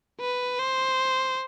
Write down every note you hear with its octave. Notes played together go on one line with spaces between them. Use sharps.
B4
C5